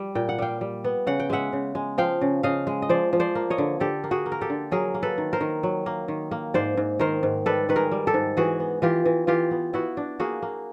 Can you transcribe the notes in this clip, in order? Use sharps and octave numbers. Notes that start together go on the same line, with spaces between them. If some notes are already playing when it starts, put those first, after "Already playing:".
Already playing: G3
A#2 G5
F#5
G3 F5 G5
G3
B3
C#3 F#5
G5
G#3 E5 F#5
C#3
G#3
F3 F5 G5
C#3
C#3 D#5 F5
G#3
D#5
F3 C5 D5
F3
C5 D5
A#3
C#5 D#5
D3
D3 G4 A4
A#3
F#4 G#4
A#3
A#4
G4 A4
D3
F#3 G#4 A#4
A#3
A4 B4
D#3
A#4 C5
D#3
F#3
A#3
D#3
A#3
G#2 C5 D5
G#2
D#3 A#4 C5
G#2
G3 A4 B4
D#3 B4
G#4 A#4
G3
G4 A4
G#2
E3 F#4 G#4
B3
E3 F4 G4
E3
E3 F4 G4
B3
B3 E4 F#4
D4
A#3 F#4 G#4
A#3